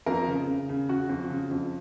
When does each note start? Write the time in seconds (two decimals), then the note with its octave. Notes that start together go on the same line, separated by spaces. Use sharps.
0.06 F2 A#4
0.28 C#3
0.48 C#3
0.69 C#3
0.89 C#3 F#4
1.09 F2
1.30 C#3
1.51 F2